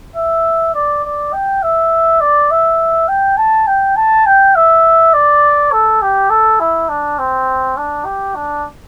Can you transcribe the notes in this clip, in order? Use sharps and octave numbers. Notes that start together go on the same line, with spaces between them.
E5
D5
D5
G5
E5
D5
E5
G5
A5
G5
A5
G5
E5
D5
A4
G4
A4
E4
D4
C4
D4
G4
D4